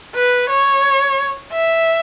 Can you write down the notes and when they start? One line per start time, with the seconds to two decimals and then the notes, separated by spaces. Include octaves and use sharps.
0.15 B4
0.49 C#5
1.52 E5